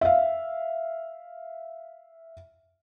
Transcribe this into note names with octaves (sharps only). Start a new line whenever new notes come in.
E5 F5